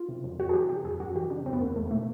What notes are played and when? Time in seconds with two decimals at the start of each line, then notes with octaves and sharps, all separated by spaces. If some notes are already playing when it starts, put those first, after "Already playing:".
Already playing: F4
0.09 C3
0.24 F2
0.39 F2 F#4
0.49 G#4
0.54 E3 G4
0.69 C3 G4
0.84 F2 G#4
1.00 F#2 F#4
1.15 E3 G4
1.30 C#3 D4
1.45 F#2 C4
1.53 B3
1.60 E2 A#3
1.76 E2 A3
1.91 B2 A3